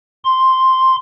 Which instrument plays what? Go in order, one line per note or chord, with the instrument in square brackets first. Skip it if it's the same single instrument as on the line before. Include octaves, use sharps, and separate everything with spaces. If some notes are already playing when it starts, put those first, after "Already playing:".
[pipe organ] C6